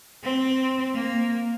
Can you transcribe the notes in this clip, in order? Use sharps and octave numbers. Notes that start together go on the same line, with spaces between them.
C4
A#3